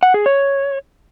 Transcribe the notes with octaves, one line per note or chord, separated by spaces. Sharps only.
F#5
G#4
C#5